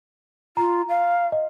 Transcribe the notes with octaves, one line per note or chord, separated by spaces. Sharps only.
F4 A#5
F5
D#5